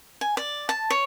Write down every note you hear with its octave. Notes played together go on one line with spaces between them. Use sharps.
G#5
D5
A5
C#5